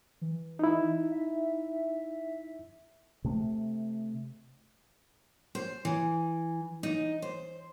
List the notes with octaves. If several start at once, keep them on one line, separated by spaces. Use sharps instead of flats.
E3
D#4 E4
E5
C3 A3
C5
E3
D#4
C5